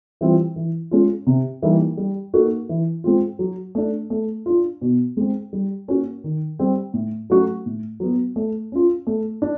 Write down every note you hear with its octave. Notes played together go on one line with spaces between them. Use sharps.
E3 G3 C4 F4
E3
G#3 C#4 F4
C3
E3 G3 A#3 D#4
G3
A#3 D#4 F#4 A4
E3
G#3 C4 F4
F#3
A3 D4
A3
D4 F4
B2
G#3 C4
G3
A#3 C#4 F#4
D#3
G3 C4
A2
F#3 A3 C#4 F#4
A2
F#3 B3
A3
C#4 F4
A3
D4